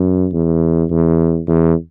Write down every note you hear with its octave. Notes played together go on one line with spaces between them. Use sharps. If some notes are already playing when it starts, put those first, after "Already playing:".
Already playing: F#2
E2
E2
E2